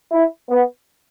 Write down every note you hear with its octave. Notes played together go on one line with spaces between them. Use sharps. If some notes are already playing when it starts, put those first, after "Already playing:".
E4
B3